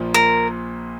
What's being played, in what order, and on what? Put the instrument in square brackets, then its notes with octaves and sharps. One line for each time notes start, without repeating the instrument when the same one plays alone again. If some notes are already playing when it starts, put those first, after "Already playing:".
Already playing: [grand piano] A#1 A#2 F3
[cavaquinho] A#4